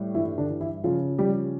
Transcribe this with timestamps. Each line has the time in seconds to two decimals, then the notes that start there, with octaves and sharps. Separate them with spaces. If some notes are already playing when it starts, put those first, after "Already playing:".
Already playing: A2 G3
0.15 G2 E3 E4
0.38 D3 D4
0.49 E3
0.60 E3 E4
0.84 C#3 F3 F4
1.18 F3 G3 G4